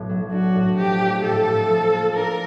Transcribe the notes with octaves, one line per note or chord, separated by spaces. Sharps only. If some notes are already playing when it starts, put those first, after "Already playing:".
Already playing: B1 A2 B3
F#3
D4 F#4
A2
F3 G4
A3
A2 A4
A2
F3
A#3
D4 A#4